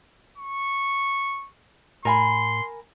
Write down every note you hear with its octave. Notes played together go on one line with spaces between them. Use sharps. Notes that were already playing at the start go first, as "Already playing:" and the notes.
C#6
A2 A#4 G#5 B5 C6